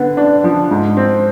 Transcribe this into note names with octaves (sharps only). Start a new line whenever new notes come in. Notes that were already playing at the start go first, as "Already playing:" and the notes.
Already playing: D3 B3
D4
F3
G#2
C4